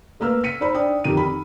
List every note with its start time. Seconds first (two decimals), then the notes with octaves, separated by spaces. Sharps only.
0.20 A3 A#3 B4 E6 F6
0.44 B6 C#7 D#7
0.60 D#4 C5 B5
0.74 D4 G5 D#6
1.04 F2 D#3 G4 D#7
1.17 B5